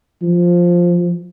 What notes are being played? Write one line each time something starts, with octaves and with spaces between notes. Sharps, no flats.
F3